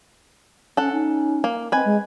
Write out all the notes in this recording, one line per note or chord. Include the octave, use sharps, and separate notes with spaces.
C#4 A4 F#5
C#4 D#4
A#3
C4 B4 D#5 G#5
G#3